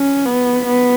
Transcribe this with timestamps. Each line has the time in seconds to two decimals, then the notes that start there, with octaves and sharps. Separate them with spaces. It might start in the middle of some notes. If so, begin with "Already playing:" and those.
Already playing: C#4
0.26 B3
0.66 B3